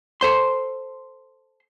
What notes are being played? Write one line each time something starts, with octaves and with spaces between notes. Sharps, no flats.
A4 C5 C6